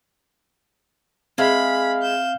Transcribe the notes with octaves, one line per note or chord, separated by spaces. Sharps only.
G#3 C4 E5 F5 B5
G6 E7